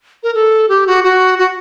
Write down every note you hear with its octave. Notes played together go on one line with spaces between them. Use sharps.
A#4
A4
G4
F#4
F#4
F#4